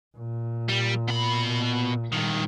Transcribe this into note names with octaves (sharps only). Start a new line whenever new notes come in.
A#2
G3
B2 B5
G2 A#2 D#3